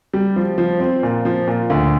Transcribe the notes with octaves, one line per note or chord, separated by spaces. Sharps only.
G3
F3
F3
C4
A#2
F3
A#2
D2